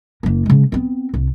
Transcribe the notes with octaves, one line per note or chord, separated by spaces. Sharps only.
F#1 A#3
C#3 G#3
B3 C4
C2